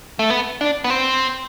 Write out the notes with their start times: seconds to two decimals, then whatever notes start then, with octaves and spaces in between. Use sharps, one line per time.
0.19 A3
0.30 B3
0.61 D4
0.84 B3
0.90 C4